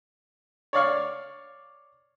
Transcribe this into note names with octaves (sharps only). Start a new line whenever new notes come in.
C#5 D5 F5 C#6